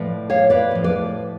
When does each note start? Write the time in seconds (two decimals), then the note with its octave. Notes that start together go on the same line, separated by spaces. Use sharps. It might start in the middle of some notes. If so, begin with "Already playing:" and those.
Already playing: A2 F3 B4 D5
0.30 C#5 F5
0.50 B4 D5
0.71 A2 F3
0.84 B4 D5